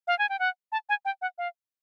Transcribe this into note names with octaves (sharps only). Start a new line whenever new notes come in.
F5
G#5
G5
F#5
A5
G#5
G5
F#5
F5